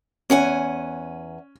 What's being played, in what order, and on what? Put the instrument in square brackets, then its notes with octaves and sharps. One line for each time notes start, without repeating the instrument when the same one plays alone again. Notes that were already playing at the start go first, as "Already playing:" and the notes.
[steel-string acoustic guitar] E2 F#5 G#5 [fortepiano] C#4